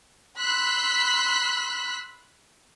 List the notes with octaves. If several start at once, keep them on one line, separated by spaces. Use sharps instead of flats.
B5 C6 E6 F#6 B6